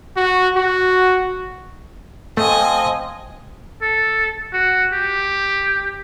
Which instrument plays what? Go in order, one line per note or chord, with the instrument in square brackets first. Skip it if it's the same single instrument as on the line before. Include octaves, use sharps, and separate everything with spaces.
[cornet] F#4
F#4
[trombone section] F3 C4 [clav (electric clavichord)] A3 [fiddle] D#5 G#5
[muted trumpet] A4
F#4
G4